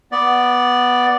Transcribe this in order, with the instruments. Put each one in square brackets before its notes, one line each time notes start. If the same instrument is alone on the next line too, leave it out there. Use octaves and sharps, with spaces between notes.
[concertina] B3 D5